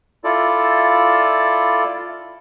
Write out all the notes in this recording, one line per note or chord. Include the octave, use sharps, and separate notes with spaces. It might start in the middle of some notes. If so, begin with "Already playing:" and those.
E4 F4 A4 D5